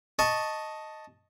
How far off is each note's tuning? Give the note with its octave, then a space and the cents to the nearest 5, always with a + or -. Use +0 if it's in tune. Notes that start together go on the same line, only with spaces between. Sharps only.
D#5 +0 A5 +0 C#6 +0